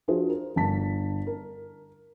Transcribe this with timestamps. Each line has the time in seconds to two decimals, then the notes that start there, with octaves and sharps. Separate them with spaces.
0.08 F3 D4 F4 F#4 G#4 C5
0.29 A#4
0.56 G1 D4 A5 B6
1.27 A#4